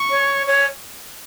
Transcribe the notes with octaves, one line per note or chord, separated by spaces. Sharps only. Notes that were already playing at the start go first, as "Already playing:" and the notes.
Already playing: C#6
C#5
C#5